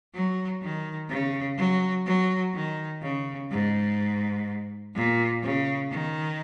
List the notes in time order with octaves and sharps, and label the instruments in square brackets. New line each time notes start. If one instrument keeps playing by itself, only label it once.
[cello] F#3
D#3
C#3
F#3
F#3
D#3
C#3
G#2
A#2
C#3
D#3